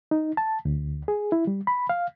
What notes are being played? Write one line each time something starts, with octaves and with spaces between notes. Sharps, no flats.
D#4
A5
D2
G#4
E4
G3
B5
F5